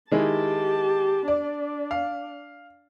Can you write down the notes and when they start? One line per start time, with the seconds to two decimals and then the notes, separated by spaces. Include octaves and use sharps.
0.11 D#3 G#3 E4 G4 A5
1.28 D4 D5
1.91 F5